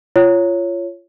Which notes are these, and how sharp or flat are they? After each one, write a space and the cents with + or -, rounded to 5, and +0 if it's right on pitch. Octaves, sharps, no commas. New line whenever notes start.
F4 -20 C#5 +0